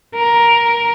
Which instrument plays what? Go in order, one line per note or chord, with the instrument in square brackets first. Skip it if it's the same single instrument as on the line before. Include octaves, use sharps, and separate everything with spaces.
[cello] A#4